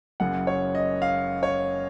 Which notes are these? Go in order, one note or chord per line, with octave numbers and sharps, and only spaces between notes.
F#1 F#2 C#3 F#5
C#5
D#5
F5
C#5